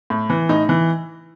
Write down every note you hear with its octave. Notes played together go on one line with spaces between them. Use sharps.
A2
E3
A2 D#4
E3